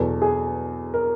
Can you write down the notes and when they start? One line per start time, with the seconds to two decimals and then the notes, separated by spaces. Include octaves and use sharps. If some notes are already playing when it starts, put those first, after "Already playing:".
Already playing: E2 B2 F#3 A4
0.22 G#4
0.94 A#4